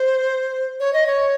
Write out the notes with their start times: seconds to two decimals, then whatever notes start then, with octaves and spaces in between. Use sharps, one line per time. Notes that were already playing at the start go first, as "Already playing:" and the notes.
Already playing: C5
0.80 C#5
0.93 D#5
1.07 C#5